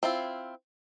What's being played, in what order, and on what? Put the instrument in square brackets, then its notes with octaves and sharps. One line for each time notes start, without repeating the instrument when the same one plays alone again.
[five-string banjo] C4 E4 F4